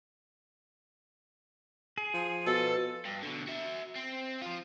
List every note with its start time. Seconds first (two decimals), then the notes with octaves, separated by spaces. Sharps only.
1.98 G#4
2.14 F3
2.46 B2 A4
3.05 G2
3.23 B2 D3
3.47 F#4 E5
3.96 C4
4.42 F3 F4